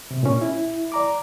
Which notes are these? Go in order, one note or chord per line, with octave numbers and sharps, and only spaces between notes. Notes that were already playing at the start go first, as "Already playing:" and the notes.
C3
A#2 C#4
E4
D5 A#5 D6